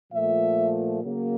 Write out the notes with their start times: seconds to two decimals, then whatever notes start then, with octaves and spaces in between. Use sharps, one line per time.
0.11 A#2 F3 A3 E5
1.04 C#3 F#3 A#3